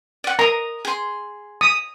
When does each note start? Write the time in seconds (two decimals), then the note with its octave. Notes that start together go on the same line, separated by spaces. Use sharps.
0.24 D5 F#5
0.39 A#4 A#5 D#6
0.85 G#4 C6
1.61 D#6